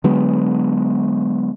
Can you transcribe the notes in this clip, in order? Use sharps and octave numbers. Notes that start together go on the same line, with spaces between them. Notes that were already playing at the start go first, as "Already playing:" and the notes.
D3 F#3 G#3 B3